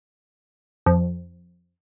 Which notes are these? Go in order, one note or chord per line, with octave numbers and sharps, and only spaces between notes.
F2